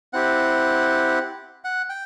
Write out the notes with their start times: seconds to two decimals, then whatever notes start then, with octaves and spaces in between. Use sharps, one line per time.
0.13 C4 E4 G4 F#5
1.64 F#5
1.89 G5